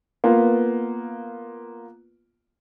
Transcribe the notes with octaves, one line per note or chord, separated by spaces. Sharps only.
A#3 B3 F4 B4